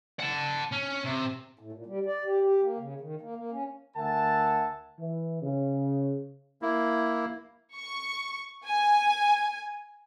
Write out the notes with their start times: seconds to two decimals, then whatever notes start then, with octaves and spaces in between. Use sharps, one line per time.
0.19 F#5 A5
0.72 C#4
1.04 C3
1.59 A2
1.73 A#2
1.86 G3
2.06 D5
2.24 G4
2.41 G4
2.62 A#3
2.79 C#3
3.01 D#3
3.21 A#3
3.36 A#3
3.51 C#4
3.97 D2 A#4 E5 F#5 G#5 A5
4.98 E3
5.41 C#3
6.62 A#3 E4
7.76 C#6
8.66 G#5